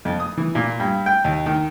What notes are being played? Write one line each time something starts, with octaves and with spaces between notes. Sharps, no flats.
F2
D#6
E3
A#2
G2
G5
D#2
D#3